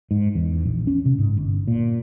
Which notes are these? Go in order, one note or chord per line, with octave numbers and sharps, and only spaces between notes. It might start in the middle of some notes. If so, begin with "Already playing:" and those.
G#2
E2
A#1
C#4
C3
G#2
G1
A#2